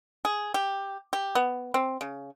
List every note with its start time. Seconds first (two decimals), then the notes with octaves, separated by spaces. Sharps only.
0.25 G#4
0.54 G4
1.13 G4
1.35 B3
1.74 C4
2.01 C#3